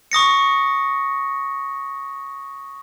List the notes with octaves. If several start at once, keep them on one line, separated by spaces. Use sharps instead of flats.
C#6 D#6 A#6 C#7